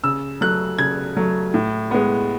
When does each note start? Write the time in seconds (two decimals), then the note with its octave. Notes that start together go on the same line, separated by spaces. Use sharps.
0.04 C#3 E6
0.41 F#3 A3 F#6
0.78 C#3 G#6
1.17 F#3 A3
1.54 A2
1.91 G#3 B3